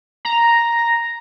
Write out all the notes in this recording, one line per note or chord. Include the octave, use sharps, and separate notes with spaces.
A#5